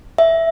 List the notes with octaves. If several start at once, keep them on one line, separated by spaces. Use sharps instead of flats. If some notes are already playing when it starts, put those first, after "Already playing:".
E5